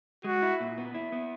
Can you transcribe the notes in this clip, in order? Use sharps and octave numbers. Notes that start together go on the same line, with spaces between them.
G#3 F#4
E4
A#2
B3
E4
B3